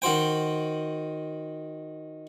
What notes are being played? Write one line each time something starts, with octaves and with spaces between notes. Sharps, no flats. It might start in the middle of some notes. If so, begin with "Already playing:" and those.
D#3 F#4 C5 G5